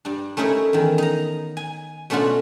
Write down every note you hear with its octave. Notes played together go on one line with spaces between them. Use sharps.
G2 D4
A3 C#4 D#4 E4 A#4 C#5
E2 D#3
D#4 A#5
G#5
B2 A3 C#4 D4 F4 F#4